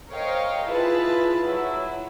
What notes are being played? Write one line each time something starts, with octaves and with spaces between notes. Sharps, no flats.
A#4 C5 C#5 D#5 F5 G5
E4 F4 G#4 B4 E5 A5
F#3 E4